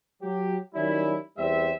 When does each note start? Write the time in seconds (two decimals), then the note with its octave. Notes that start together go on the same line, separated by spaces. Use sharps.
0.22 F#3 G4
0.75 D#3 F#3 G3 C#4 E4
1.38 E2 G3 C4 E5